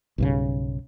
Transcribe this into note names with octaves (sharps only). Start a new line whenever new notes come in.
B1 G2 C#3